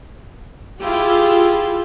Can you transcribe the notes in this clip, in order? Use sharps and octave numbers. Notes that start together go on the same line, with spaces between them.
E4 F4 G4 G#4